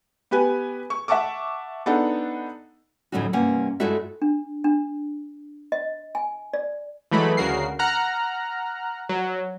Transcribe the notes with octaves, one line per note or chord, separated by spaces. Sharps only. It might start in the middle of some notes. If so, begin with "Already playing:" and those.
B3 G4 B4 G#5
C#6
E5 F#5 A5 C#6 D6
B3 D4 D#4 A4 F#5
D2 A2 F#3 C#4 D#4 F#4
G2 C3 A#3 C#4 F#5
G2 G#3 A3 E4 F#4 E5
D4
D4
D#5
G#5
D5
E3 F#3 G#3 A3 B5
D2 C#3 F#4 A#4 C7
F#5 A#5 F6 F#6
F#3